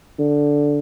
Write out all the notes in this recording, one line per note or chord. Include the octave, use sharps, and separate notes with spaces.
D3